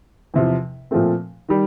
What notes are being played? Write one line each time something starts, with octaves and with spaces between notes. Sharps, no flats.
E2 C3 F3
A#2 F3 A3 C4
D#3 G3